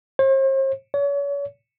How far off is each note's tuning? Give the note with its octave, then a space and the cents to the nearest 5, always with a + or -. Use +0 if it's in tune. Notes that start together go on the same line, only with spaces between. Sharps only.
C5 +45
C#5 +35